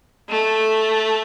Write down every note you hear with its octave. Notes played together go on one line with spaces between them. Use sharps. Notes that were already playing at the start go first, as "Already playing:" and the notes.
A3